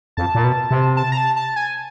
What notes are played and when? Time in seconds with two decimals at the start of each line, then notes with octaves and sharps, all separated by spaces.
0.17 F2 A5
0.35 A#2
0.44 B2
0.71 C3
0.97 A5
1.12 A#5
1.17 A5
1.36 A5
1.56 G#5